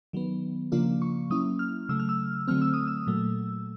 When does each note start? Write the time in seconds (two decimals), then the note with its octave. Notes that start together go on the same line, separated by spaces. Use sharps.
0.13 D#3 F#3 B3
0.72 C#3 F3 A#3 D4 F4
1.02 C#6
1.30 F#3 A#3 C#4 E4 D#6
1.59 F6
1.89 C#3 F#3 A3 E6
1.99 F6
2.09 E6
2.48 D3 F#3 A3 C4 F6
2.62 E6
2.74 D#6
2.87 E6
3.07 A#2 F#3 A3